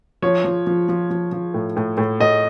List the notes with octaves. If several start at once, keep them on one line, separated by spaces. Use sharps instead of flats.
F3 C#5
F3
F3
F3
F3
F3
A2
A2
A2
A2 D#5